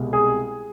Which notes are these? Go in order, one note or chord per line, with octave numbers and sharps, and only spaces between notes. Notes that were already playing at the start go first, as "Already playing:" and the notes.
Already playing: C2 B2 G#3
G#4